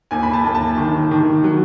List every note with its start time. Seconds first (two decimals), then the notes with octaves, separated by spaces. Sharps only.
0.11 D#2 G#5
0.23 B5
0.33 A5
0.44 D#2
0.55 A5
0.78 D#3
1.11 D#3
1.44 F#3